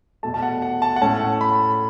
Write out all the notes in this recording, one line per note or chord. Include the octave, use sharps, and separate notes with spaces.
E2 B2 A3 A5
A5
F#5
F#5
A5
F#5
A2 A3 C#4 A5
B5